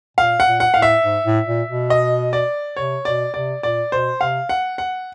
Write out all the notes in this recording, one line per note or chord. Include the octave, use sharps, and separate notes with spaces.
A#2 F5
F#5
A#2
F#5
A2 F5
E5
G#2
A2
A#2
B2
D#5
D5
C3 C#5
B2 D5
C3 D5
A#2 D5
B2 C5
C3 F5
F#5
F#5